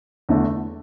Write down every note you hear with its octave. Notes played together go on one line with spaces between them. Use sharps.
E2 D3 A3